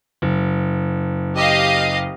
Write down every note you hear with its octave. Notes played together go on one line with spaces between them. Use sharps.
F#1
G4 D#5 F5